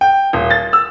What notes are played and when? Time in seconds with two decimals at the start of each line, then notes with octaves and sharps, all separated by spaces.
0.01 G5
0.33 D#1
0.50 A6
0.73 E6